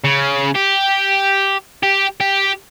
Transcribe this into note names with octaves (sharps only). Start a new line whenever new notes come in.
C#3
G4
G4
G4